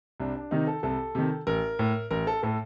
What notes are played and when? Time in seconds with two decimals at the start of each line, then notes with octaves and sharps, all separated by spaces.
0.20 C2 D4
0.35 D4
0.51 C3 D#3 D#4
0.67 A4
0.83 C2 A4
1.15 C3 D#3
1.47 A1 A#4
1.79 A2
2.11 A1 A#4
2.27 A4
2.43 A2 A4